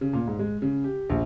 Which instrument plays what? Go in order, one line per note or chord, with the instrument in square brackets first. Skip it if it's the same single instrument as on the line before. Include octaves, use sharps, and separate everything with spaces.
[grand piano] C#3
A#2
G#2
G#3
C#3
G4
A#1